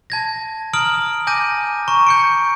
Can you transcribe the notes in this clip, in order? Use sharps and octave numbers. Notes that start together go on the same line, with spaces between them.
A5 G#6 A#6
A#5 D#6 F6 D7 F#7
G#5 D6 G6 A#6 D#7
A#5 C#6
G6 C#7 D7